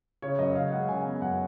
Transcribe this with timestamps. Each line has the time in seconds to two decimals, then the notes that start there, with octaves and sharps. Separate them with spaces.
0.22 C#3 C#5
0.39 F#2 D#5
0.55 C#3 F5
0.72 G#3 F#5
0.88 C#3 G#5
1.05 B3
1.22 F#2 F#5